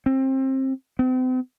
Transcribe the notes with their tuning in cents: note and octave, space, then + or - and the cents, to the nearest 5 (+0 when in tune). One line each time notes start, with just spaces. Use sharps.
C4 +25
C4 -40